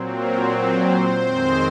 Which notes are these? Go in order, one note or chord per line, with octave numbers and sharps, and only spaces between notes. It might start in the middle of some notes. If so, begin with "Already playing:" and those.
Already playing: A#2 F#3 C4
A#4
C5
C5
F2 D#3 G#3 C4